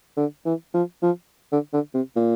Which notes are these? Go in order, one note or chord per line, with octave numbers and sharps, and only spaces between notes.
D3
E3
F3
F3
D3
D3
C3
A#2